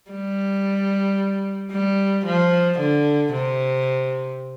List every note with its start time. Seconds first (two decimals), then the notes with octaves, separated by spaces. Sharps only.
0.11 G3
1.72 G3
2.26 F3
2.79 D3
3.33 C3